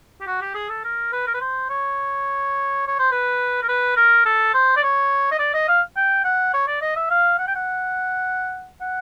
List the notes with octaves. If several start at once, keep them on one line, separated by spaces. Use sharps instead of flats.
G4
F#4
G4
G#4
A4
A#4
B4
A#4
B4
C5
C#5
C#5
C5
B4
A#4
B4
A#4
A4
C5
D5
C#5
D#5
D5
D#5
F5
G5
F#5
C#5
D5
D#5
E5
F5
F#5
G5
F#5
F#5